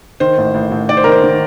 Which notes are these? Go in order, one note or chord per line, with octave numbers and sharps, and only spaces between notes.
D#3 C5
A1
A1
A1
D#3 D5
C5
D#3 A#4
C5
D#3